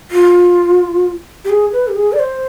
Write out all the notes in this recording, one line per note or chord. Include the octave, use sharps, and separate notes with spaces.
F4
G4
G#4
B4
G4
G#4
D5
C5